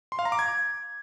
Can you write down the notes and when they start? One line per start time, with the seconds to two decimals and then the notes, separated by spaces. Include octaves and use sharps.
0.12 C6
0.19 F5
0.25 A#5
0.32 D6
0.39 G#6